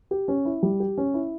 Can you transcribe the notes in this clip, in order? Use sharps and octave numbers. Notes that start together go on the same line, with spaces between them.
G4
C#4
E4
G3
G4
C#4
E4